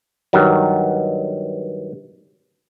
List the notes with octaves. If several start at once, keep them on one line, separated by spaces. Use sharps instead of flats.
G2 D#3 F#3